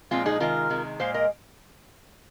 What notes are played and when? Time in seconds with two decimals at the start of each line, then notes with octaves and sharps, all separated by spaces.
0.11 A#2 F3 G#3 C4 F4
0.26 D#4 G#4
0.40 C3 D#3 G#3 F4 A#4
0.70 C3 D#3 G#3
1.00 A#2 G#3 C5 F5
1.14 A#4 D#5